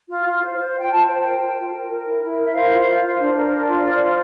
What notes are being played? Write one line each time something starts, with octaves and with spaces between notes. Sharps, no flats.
F4
F4
C5
C5
F4 G5
F4 A5
C5
A#4 G5
F4
F4
A#4
A#4
E4
E4
A#4
E5
C5 F5
F4
F4
C5
D4
A#4
D4
F4
C5 D5
F4